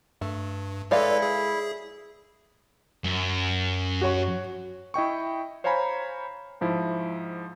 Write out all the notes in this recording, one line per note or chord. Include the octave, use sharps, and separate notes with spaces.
G2 A3
G#3 E4 A4 B4 C#5 D5 F5
G#4
F#2
F#4 C#5 C#6
E4 D#5 G5 C#6
C5 C#5 F5 G#5 A#5 B5
G#2 F3 E4